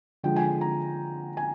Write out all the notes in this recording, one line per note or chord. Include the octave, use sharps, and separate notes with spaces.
D3 F3 G#3 G5
G#5
A#5
G#5